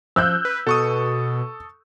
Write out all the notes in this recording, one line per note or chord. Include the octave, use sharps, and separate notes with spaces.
F3 E6 F#6 G6
B4
B2 A4 C#6 D#6